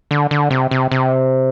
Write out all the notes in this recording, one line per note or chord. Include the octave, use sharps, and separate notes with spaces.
D3
D3
C3
C3
C3